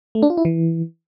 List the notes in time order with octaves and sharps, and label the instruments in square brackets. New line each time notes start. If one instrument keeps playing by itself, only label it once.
[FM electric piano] A3
D4
F4
E4
E3